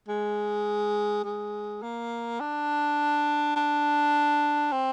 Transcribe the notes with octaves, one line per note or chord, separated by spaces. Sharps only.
G#3
G#3
A#3
D4
D4
C4